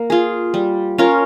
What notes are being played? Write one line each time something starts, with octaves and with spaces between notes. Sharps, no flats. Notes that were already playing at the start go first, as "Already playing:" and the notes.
Already playing: A#3
F4 G#4
G3
C#4 F4 A#4